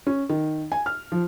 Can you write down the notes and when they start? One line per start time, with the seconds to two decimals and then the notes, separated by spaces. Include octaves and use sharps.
0.07 C#4
0.29 D#3
0.72 G#5
0.86 F6
1.12 F3